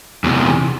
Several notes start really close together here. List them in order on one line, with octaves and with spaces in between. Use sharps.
E2 A2 C3